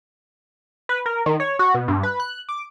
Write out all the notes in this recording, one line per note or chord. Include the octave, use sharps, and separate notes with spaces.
B4
A#4
D#3
C#5
F#4
B2
G2
B4
F#6
D6